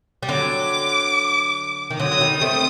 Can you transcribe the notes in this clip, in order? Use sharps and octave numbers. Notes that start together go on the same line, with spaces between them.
G3
D3 F#3 D6
D#3
D3 F#3 D#6
F#3
D#3 G3
A3 C4